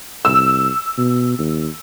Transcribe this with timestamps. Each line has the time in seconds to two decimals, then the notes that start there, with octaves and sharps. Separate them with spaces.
0.25 C2 E6
0.98 B2
1.38 D#2